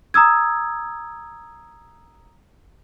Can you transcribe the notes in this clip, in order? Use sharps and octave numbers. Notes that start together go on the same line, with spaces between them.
A#5 D#6 E6 G#6